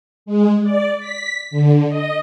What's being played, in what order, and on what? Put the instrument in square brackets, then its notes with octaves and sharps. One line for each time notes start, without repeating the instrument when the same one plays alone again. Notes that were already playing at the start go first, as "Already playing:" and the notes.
[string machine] G#3
D5
B6
D3
D#5